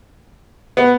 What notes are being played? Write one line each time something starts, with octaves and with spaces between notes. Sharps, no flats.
B3